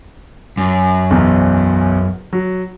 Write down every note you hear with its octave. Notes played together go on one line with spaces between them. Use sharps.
F#2
B1 E2
F#3